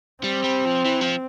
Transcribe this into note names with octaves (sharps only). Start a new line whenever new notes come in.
G3 C4
G3
F3
E3
F3